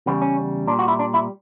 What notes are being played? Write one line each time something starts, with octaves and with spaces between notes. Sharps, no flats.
E2 C#3 G3 B3
C#4
A#2 G3 D4
F#4
E4
D4
E4